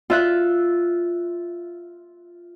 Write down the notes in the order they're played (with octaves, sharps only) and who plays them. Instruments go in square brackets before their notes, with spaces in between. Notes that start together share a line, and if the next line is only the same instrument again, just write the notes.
[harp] F4 E5 F#6